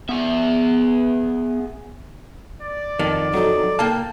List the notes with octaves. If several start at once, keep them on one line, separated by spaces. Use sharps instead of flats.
B3 G#4 E5
D5
F2 D#3 A5
F#3 D#4 A4
A#3 F5 G5 A5